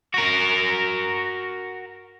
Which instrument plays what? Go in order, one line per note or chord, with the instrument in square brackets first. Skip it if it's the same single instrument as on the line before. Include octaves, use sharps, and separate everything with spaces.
[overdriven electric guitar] F#4 A#4